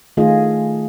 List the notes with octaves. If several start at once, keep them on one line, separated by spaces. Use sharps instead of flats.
D#3 A3 F4 G#4 D#5